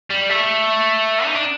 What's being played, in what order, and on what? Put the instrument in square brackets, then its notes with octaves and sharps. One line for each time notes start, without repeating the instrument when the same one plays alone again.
[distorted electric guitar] G3
A3
D#4
D4